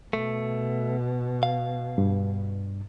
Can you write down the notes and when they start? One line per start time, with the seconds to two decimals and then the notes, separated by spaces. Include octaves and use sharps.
0.13 B2 A3
1.43 F5
1.98 G2